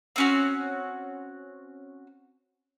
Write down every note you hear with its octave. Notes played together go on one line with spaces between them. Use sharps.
C4 C#4 F#4